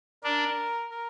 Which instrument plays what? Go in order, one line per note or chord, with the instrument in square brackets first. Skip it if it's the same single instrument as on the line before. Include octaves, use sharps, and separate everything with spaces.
[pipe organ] D4 [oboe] A#4
[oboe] A#4